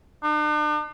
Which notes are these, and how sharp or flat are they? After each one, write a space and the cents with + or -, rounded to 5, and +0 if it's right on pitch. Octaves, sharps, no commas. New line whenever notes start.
D4 +45